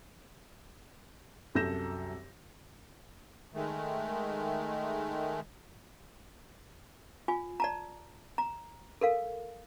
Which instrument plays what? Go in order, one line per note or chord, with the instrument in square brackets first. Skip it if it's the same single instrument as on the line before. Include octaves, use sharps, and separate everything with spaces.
[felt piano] C2 F#2 A4 G6 A#6 E7
[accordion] D#3 G#3 A3
[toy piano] F4 G#5
D5 A5 A#5
A#5
A4 A#4 F5